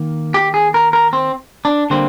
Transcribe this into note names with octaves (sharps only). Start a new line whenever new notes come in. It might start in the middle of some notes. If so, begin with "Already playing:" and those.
Already playing: D#3 A#3
G4
G#4
A#4
A#4
C4
D4
D3 G3 A#3 C4